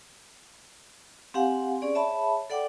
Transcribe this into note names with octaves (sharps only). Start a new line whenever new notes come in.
C4 G4 F5 F#5 G#5 C6
C#4 G#4 D5
G#4 C#5 E5 A5 B5
A4 D5 F#5 G5 D6